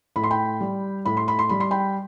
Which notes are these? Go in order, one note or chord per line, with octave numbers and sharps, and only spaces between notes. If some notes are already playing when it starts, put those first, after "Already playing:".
A2 B5
C6
G5 B5
G3
A2 B5
C6
B5
C6
G3 B5
C6
G5 B5